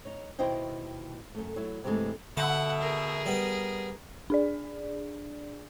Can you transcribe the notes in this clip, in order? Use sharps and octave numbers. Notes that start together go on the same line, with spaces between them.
D#4 C#5
D#2 B2 E4 C5 D#5 G5
F#2 A3
F#3 E4
G2 C3 E3 F3 G#3 A3
B2 D3 A3 E5 F#5 A5
G#4 A#4
G3 B3
D4 G#4 D5